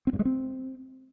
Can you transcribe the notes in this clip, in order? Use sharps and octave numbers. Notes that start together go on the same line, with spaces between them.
C4
G2
G#3
C4